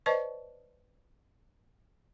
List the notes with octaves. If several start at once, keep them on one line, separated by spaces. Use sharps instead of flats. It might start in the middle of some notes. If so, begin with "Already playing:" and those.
B4 C5 D5 D#5 A5 C#6